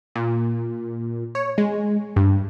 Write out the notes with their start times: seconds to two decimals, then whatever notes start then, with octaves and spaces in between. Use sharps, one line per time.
0.15 A#2
1.35 C#5
1.58 G#3
2.16 G2